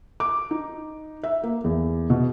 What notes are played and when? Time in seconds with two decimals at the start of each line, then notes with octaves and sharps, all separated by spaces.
0.20 D6
0.51 D#4
1.23 E5
1.43 A#3
1.64 E2
2.10 B2